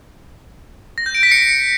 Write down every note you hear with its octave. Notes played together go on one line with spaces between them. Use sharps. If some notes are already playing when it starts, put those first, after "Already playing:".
A#6
G6
D7
B6
C#7